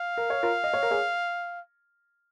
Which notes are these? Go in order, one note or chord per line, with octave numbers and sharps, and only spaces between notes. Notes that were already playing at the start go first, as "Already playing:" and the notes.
Already playing: F5
A#4
C#5
F4 A#4
D#5
C#5
A#4
G#4 C#5